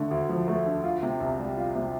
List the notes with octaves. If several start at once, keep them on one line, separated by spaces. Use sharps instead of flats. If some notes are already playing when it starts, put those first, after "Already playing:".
Already playing: D3 A3
D2
F3
A3
D3
F4
C3
C2
G3
F4
C3